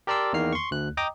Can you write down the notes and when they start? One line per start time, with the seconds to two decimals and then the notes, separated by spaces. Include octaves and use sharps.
0.07 G4 A#4 D5 A5 C6 E6
0.33 E2 D#3 A#3 F6 C7
0.53 C6 C#6
0.71 D2 F#6
0.97 D#5 G5 A#5 D6 D#6